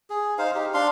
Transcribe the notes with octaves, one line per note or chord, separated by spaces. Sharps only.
G#4
D#4 C5 F5
D#4 G4
D4 F5 C6